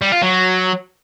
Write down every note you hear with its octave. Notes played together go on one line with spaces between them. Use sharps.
G3
F4
F#3